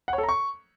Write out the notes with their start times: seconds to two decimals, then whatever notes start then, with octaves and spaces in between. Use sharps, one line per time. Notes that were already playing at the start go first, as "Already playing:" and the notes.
0.08 F#5
0.13 C#5
0.18 A4
0.23 A#5
0.29 C#6